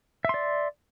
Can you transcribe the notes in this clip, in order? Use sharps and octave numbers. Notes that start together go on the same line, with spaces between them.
D5 E5 C6